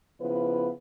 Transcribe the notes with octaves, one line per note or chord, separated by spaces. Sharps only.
C#3 F3 B3 E4 B4